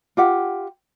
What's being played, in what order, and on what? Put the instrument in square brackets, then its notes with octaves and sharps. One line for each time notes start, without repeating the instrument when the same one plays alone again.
[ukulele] F4 G4 F#5